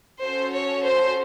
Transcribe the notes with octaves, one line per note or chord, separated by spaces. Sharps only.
C#4 F#4 A4 C5
C#5
C5